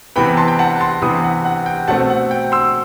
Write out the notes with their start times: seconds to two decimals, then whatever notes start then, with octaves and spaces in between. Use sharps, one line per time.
0.16 C3 E3 B3 G5 B5
0.37 A5 C6
0.48 G5
0.59 F#5 A5
0.80 A5 C6
1.02 C3 E3 B3 B5 D#6
1.24 F#5
1.45 F#5
1.66 G5
1.88 B2 A3 C4 F#5 A5
2.10 F#5
2.31 G5
2.52 C6 E6